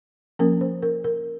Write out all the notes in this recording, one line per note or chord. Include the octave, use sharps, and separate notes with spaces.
F3 A#3 C#4 A#4
C5
A#4
A#4